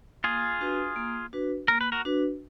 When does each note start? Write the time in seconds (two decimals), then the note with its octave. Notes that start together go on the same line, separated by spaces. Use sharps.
0.24 A#3 F4 G#4
0.60 D4 F#4 B4
0.96 A#3
1.33 D4 F#4 B4
1.68 A#3 A#4
1.81 B4
1.92 F#4 A#4
2.05 D4 F#4 B4